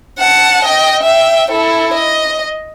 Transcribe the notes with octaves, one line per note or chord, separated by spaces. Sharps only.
F#5 A5
D#5 G5
E5 G5
E4 A4
D#5